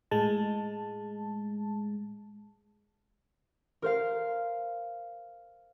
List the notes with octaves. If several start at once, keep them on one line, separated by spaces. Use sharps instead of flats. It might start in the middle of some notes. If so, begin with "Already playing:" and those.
A2 G#3 A5
A#4 C5 F5